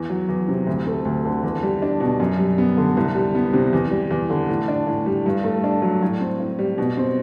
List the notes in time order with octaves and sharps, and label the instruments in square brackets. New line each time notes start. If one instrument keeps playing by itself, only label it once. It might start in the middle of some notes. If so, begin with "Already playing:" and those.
Already playing: [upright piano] E2
F#3
E2
C3
D2
A3
D2
D3
E2
G3
D4
B2
F#2
G3
B3
D3
C2
G3
B3
C3
E2
G3
E2
D3
A2
D4
A2
G3
G2
A3
D4
F#3
A2
C4
A2
G3
B2
C4